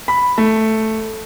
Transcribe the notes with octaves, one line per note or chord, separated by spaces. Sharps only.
B5
A3